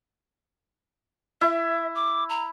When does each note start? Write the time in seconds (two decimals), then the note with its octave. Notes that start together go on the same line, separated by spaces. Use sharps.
1.41 E4 E5
1.95 D6
2.29 A#5